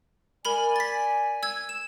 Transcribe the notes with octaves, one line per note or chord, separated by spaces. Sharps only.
A#4 D5 G#5 B5 F#7
A6 B6
E6 G#6
E7